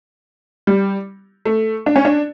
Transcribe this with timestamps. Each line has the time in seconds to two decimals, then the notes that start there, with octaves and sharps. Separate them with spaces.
0.67 G3
1.45 A3
1.86 D4
1.96 C#4
2.05 D4